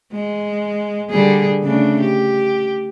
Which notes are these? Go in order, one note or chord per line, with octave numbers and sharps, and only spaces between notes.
G#3
D3 G3 G#4
C#3 A3 D4
G4